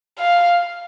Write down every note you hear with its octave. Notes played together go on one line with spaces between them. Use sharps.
F5